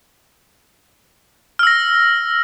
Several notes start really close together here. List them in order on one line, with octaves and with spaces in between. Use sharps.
F6 E6 A#6